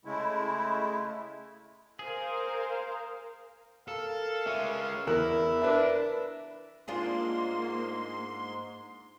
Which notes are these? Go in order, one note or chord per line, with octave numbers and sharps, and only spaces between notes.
C#3 G#3 A3 E4
G#4 A#4 C5 F5
A4 A#4 F5
G#3 C#4 E5
E2 E4 A#4 F#6
D4 A#4 B4 E5
G#2 A#3 D4 F4 G#4 C6